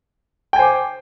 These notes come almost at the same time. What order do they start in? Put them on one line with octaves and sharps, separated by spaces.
G5 G#5 C5 D6